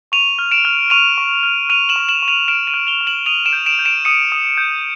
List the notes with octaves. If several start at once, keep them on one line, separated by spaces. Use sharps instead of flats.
C#6 D#7 F7
F6
D7 E7
F6
C#6 D#7 F7
C#6
F6
F6 D#7 F7
E7 F#7
C#6
E7 F#7
C#6
D#7 F7
F6 D7 E7
D#7 F7
F6
F7 G7
C#6
E7 F#7
D#6 D#7 F7
D7 E7
G6
D7 E7
G6
D7 E7
D#6 C#7 D#7
D#6
G6